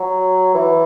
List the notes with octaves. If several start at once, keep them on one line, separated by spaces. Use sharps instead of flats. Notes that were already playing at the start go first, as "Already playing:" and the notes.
Already playing: F#3
E3